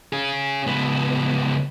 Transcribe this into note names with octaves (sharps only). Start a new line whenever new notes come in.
C#4 G#4
C#2 B3